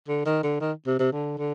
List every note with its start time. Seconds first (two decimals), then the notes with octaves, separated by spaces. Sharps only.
0.08 D3
0.26 D#3
0.43 D3
0.60 D#3
0.86 C3
0.99 C3
1.12 D3
1.38 D3